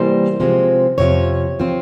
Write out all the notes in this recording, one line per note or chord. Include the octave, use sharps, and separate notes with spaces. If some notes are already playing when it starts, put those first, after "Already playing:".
Already playing: C3 E3 G3 A#3 C5
C3 F3 G#3 C4
F2 C3 F3 C#5
F3 C4